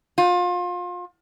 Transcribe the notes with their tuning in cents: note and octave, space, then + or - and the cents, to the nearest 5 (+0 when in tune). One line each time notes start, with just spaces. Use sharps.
F4 +30